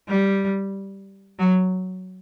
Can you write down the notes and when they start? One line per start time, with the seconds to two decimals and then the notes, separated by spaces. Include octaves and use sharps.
0.08 G3
1.39 F#3